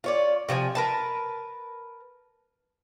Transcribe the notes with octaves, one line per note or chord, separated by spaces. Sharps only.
F4 C#5 D5
C3 F3 G4 G#5
A#4 B4 A5